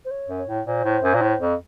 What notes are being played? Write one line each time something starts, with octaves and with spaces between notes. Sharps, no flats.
C5
C#5
F#2
C#5
A2
A#2 C5
A2
F#2
A#2
A2
F2